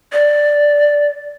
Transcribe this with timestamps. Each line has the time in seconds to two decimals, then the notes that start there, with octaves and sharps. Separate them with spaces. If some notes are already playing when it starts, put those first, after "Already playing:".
0.13 D5